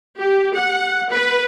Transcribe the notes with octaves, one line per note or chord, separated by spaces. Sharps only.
G4
F#5
B4